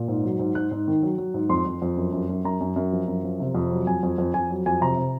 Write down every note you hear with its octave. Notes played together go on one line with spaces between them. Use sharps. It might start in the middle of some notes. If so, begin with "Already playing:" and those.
Already playing: A#2
G#2
F#3
G#2
G#2 F#6
G#2
D#3
F#3
F#3
G#2
F2 C6
F2
F2
F#2
F#2
F#2
F#2 A#5
F#2
F#2
F3
F#2
F3
C3
F2
F#3
F2 G#5
F2
F2
F2 G#5
F#3
F2 G#5
C3 A#5
C3